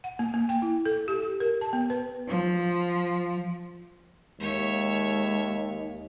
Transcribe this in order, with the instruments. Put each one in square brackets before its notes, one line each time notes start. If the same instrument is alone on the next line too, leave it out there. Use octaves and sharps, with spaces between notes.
[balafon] F#5
A#3
A#3
G5
E4
A4
G4
G4
A#4
A5
B3
B4
[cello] F3
[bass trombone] D#2 [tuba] G#3 [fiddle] C#5 E5